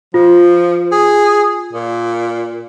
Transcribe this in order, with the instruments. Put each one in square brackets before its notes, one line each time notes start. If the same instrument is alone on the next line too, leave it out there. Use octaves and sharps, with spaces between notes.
[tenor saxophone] F3 [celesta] F4
[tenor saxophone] G#4
A#2